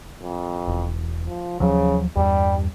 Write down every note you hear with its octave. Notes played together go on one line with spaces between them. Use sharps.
F2
E1
F3
D#2 C#3 F3 F#3
E2 G2 G3